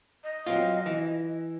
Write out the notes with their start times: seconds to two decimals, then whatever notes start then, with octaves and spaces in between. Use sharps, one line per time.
0.24 D#5
0.46 F#3 C4 F4
0.86 E3